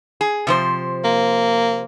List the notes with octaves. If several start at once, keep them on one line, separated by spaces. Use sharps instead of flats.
G#4
C3 F3 C5
A#3